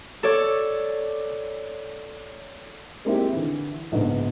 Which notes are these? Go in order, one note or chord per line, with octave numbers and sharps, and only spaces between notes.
A4 C#5 D5
G#3 A#3 C4 D#4 E4 G4
D3 E3
A#1 G#2 C#3 B3